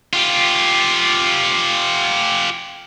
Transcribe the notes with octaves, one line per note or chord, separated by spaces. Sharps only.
F4 G4